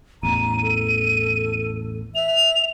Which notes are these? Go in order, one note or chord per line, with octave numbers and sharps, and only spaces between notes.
A1 E2 A#5 D#7
A4
E5 F7